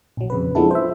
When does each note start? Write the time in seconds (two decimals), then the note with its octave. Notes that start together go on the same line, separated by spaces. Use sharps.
0.17 A#1 F#3
0.30 F2 C#3 B4
0.55 F3 G#3 B3 D4 E4 A4
0.71 C5 E5